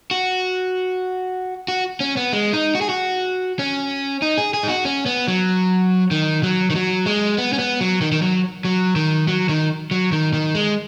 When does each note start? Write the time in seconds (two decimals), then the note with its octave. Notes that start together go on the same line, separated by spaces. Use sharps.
0.11 F#4
1.68 F#4
2.00 C#4
2.17 B3
2.33 G#3
2.53 D#4
2.75 F#4
2.81 G#4
2.89 F#4
3.59 C#4
4.22 D#4
4.38 G#4
4.54 G#4
4.63 D#4
4.69 F#4
4.85 C#4
5.06 B3
5.28 F#3
6.11 D#3
6.43 F#3
6.70 D#3
6.75 F#3
7.06 G#3
7.38 B3
7.53 C#4
7.59 B3
7.81 F#3
8.01 D#3
8.12 D#3
8.22 F#3
8.65 F#3
8.96 D#3
9.28 F#3
9.49 D#3
9.91 F#3
10.12 D#3
10.33 D#3
10.55 G#3